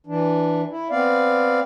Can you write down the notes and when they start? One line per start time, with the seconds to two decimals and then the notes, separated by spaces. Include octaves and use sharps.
0.07 E3 D4
0.70 E4
0.90 B3 C4 D5 F5